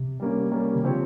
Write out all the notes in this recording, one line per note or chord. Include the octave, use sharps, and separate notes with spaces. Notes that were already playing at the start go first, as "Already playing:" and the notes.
Already playing: C3
G3 A#3 C#4
G3 A#3 C#4
D#3
C#3 F3 C4 G4 C#5